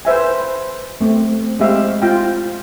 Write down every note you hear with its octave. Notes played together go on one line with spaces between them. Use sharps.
B4 C5 E5 G#5
A3 C4
G#3 C4 G4 E5 F5
F4 G5